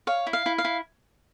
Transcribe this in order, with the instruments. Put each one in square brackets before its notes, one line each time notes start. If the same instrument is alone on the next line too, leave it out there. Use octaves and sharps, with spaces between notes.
[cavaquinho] C#5 F5
E4
F5
E4
F5
E4